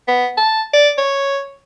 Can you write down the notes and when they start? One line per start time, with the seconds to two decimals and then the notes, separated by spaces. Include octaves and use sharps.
0.08 B3
0.37 A5
0.74 D5
0.98 C#5